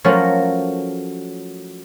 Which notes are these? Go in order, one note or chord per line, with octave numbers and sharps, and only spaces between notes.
F3 F#3 A3 C#4 F4 A#4